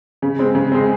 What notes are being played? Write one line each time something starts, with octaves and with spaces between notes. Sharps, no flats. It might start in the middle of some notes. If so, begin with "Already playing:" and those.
C#3
G#3 C4
C#3
G#3 C4